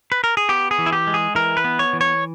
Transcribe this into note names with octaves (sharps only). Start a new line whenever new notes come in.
B4
A#4
G#4
B3 G4
G#4
E3
E4
G4
G#3
G#4
E3 A#4
B4
B3
C#5
E3
C#5